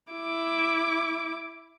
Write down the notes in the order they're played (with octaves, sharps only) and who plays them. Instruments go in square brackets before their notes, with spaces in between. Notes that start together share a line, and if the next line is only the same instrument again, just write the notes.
[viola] E4 D6